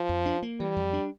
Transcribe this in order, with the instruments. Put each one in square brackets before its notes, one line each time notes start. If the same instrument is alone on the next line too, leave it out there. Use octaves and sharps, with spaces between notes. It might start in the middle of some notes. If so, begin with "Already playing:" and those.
Already playing: [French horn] F3
[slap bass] F2
D4
A#3
[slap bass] E3 [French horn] G3
[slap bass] F2
D4